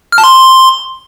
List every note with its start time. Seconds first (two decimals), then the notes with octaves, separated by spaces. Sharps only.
0.12 F6
0.18 A5
0.24 C6